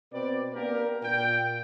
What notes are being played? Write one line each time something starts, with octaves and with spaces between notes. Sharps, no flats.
B2 C4 B4 D5
A#3 B3 D4 G4 A#4
A#2 G5